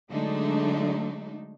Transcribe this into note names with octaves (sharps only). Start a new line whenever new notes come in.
D3 F#3 G#3 A3 D4 D#4